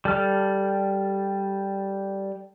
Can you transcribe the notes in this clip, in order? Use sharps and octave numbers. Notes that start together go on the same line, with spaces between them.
G3 A4 F6